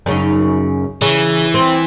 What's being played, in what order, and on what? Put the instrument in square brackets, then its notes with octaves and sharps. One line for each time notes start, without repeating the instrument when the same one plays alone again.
[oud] F#2 C#3 D#4
[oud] C#3 [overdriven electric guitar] E3
[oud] C4